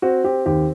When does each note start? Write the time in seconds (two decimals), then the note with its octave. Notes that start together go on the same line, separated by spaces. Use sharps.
0.02 C4 F#4
0.24 C4 G4
0.46 D#2 G4